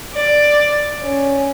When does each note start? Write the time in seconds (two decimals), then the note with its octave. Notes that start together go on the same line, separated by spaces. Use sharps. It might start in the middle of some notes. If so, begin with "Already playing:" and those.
0.14 D5
1.02 C#4